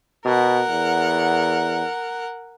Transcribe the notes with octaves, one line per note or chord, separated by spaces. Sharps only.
B2 A#4 F#5
E2